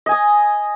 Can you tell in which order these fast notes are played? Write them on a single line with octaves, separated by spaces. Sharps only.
D#5 G#5 D#6